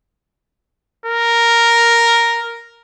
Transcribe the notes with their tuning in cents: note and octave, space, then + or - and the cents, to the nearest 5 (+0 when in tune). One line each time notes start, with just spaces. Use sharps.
A#4 +0